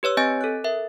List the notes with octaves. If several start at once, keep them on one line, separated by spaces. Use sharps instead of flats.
G4 B4 C#5 E6
C4 D#5 G#5 G6 A6 D7
A4 F#6
A#4 E5